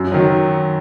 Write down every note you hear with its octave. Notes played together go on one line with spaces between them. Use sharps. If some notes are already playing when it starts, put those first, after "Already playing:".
Already playing: F#2
D#3 F#3